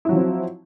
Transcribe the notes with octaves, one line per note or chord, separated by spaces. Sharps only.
F3 F#3 C4 E4